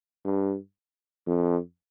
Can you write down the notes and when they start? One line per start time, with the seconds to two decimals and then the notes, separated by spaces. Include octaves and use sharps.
0.25 G2
1.27 F2